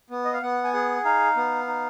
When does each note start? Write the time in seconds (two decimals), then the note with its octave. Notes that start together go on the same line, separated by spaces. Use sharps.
0.10 B3
0.25 D#5
0.33 F5
0.42 B3 F#5
0.64 G#5
0.73 G#4 F#5
1.05 D#4 F5
1.37 B3
1.67 D#4